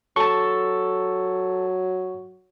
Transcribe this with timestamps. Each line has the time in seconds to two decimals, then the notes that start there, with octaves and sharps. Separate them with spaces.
0.16 F#3 A4 A5 C#6